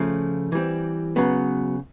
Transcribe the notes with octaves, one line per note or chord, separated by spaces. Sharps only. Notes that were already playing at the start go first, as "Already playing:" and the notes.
Already playing: C#3 F3 A3
E3 G3 C4
C#3 F#3 B3